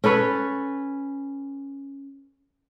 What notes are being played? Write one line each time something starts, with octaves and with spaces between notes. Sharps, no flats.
C#4 A4 B4 C#5